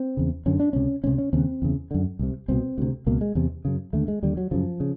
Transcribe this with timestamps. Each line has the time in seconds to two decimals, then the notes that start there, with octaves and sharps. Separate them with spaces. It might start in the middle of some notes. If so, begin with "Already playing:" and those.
Already playing: C4
0.17 E2 C#3
0.46 F#2 D3 C#4
0.60 D4
0.73 C#2 C3 C#4
1.04 C#2 C3 C#4
1.18 C#4
1.33 D#2 C#3 C4
1.62 E2 C#3
1.91 F#2 D3
2.19 C2 C3
2.48 C2 B2 C4
2.78 D2 C3
3.07 C#2 B2 A#3
3.21 G#3
3.35 E2 C3
3.65 F#2 C#3
3.93 D#2 D3 A3
4.08 G#3
4.22 D#2 D3 G3
4.37 F#3
4.51 F#2 C#3 F3
4.80 C#3